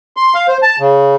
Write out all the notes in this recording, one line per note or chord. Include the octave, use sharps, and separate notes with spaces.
C6
F5
C5
A5
C#3